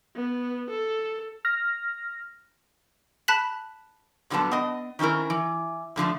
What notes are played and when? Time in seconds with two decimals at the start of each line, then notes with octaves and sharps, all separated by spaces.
0.16 B3
0.70 A4
1.45 F6 A#6
3.28 A5 B5 F#6 B6 F#7
4.30 A#2 D3 F#3 G3 B3 A5
4.51 B3 D#5
4.99 D#3 C4 C#4 E4 A#4
5.30 E3
5.96 F2 D3 F3 A3